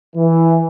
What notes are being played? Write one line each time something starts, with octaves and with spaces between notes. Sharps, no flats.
E3